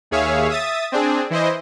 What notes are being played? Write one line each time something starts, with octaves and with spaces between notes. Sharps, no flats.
D#2 G#4 C#5 E5 F5
E5 D#6 A6
C4 D4 G#4
E3 E4 C5 D#5